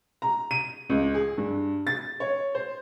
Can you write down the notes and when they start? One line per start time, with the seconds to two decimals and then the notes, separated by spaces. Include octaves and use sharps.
0.22 A#5
0.51 D#7
0.90 C#2
1.14 G#4
1.38 G2
1.87 A6
2.20 C#5
2.55 C5